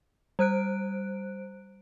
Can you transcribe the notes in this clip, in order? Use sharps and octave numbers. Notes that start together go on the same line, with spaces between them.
G3 C5 F#6 D7